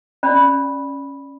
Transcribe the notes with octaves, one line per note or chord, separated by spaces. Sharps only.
C#4 D5 B5